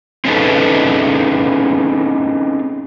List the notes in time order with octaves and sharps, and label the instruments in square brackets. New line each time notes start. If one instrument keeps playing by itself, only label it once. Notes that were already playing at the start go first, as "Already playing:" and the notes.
[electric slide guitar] C4 C#4 D#4 G#4 A4 B4